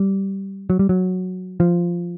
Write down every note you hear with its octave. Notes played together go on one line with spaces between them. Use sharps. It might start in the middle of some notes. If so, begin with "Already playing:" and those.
Already playing: G3
F#3
G3
F#3
F3